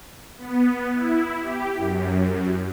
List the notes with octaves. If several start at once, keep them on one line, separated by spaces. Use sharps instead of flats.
B3
E4
G4
F#2